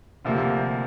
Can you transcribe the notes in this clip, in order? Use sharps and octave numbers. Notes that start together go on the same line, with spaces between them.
D2 C3 F3 A#3